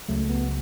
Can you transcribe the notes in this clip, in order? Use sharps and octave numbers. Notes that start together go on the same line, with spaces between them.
C#2 C#3 F#3 A3
B3